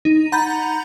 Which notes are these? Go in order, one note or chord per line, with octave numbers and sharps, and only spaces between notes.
D#4
F#5 A#5 B5 G6 A6